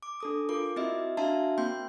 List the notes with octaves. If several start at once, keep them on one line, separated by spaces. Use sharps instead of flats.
D6
D4 A4 D#6
F4 A#4 D6
C4 E4 F#4 D#5 E5
D4 F#4 E5 F5 A5 A#5
A#3 C4 G5 C6 G6